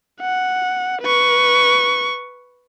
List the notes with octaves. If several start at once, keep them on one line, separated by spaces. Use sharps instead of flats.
F#5
B4 C#6